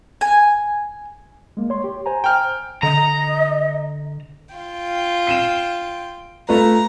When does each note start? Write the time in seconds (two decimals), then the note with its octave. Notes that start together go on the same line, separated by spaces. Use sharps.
0.21 G#5
1.57 G#3 A#3
1.70 C#5 C6
1.84 G4
2.06 C5 G#5 A#5
2.24 G5 F6
2.83 D3 D#5 A#5
4.55 F4 G5
5.27 C7 D#7 E7
6.49 A3 F4 B4 A#5